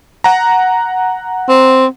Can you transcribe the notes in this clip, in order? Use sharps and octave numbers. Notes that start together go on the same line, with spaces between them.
F#5 A#5
C4